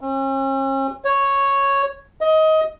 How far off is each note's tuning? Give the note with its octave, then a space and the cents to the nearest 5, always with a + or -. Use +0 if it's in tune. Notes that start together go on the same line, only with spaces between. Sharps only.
C#4 -45
C#5 -5
D#5 +20